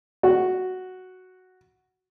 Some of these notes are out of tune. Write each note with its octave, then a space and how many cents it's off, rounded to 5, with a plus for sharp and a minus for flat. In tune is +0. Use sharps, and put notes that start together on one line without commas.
F#4 +0